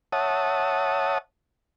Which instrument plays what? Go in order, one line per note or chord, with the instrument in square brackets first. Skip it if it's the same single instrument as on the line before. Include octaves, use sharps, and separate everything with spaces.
[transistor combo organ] C#5 E5 F#5 A5 D#6